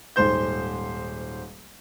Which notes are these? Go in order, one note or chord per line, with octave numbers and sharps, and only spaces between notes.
D#1 G#2 C5 G6